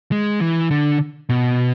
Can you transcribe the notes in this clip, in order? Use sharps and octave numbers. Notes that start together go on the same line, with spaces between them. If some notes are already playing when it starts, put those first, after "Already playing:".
G#3
E3
D3
B2